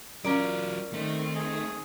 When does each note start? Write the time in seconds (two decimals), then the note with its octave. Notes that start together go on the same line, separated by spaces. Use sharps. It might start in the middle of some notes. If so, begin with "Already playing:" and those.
0.24 F#3 C#4 F4 A#4 D5
0.93 D#3 A3 C4
1.35 G#4